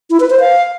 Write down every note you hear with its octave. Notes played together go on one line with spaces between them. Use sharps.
E4
B4
C5
F5